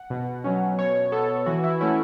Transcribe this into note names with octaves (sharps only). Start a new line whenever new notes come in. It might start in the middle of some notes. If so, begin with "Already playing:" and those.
Already playing: F#5
B2
F#3 C#4
B2 C#5
B3 A4
E3 F#4
E4
A3 C#4 E4